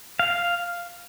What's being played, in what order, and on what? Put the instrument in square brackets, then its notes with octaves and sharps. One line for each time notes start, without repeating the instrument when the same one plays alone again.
[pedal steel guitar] F5